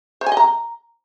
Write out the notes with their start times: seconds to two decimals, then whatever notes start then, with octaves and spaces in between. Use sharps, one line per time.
0.21 C5
0.26 G#5
0.32 D#5
0.37 A#5